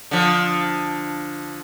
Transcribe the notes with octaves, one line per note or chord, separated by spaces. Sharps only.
D3 F3